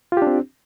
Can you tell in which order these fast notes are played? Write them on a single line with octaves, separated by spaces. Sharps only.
F4 G4 D4 C4